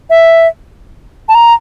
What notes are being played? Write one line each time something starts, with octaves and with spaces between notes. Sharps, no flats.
E5
A5
A#5